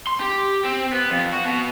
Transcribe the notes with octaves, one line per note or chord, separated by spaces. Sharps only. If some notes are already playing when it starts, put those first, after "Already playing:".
C6
G4
C4
B3
F2
F#4
B2